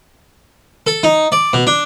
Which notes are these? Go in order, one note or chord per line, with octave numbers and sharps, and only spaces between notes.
A4
D#4
D5
B2
D4